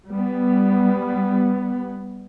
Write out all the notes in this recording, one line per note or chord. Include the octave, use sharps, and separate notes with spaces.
G3 B3